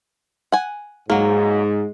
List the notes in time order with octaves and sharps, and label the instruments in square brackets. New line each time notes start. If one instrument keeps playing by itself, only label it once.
[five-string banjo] F#5 G#5
[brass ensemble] G#2 [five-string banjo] F#3 A#3 [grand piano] G#3